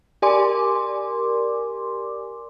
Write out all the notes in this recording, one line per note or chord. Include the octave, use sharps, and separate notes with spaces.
G4 A#4 D5 G#5 C6 D6